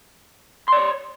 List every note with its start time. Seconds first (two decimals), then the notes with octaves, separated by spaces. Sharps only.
0.68 C6
0.72 D5
0.77 C#5